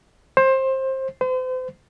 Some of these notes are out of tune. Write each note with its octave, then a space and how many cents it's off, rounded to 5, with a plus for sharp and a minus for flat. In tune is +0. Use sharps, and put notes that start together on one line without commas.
C5 +20
C5 -40